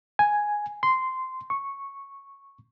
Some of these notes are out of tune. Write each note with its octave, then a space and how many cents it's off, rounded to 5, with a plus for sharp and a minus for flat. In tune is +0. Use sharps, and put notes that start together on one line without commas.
G#5 +0
C6 -10
C#6 -5